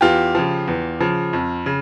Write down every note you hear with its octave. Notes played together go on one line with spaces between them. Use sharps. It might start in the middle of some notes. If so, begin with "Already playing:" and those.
E2 F4 G4
C#3 F3
E2
C#3 F3
F2
C#3